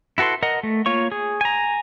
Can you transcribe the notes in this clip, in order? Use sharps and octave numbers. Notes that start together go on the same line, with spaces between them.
E4 F#4 A4 B4 C6
A#4 D#5 F#5
A3
A#3 F4 C#5 C#6
G#4
G#5 A#5